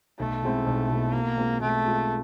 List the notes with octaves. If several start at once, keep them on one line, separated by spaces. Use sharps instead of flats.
B1 A3
B2 G#3 C4 E4
B1
B2 G#3 C4 E4
B2 A#3
G#3 C4 F4
B2 A3
G#3 C4 F4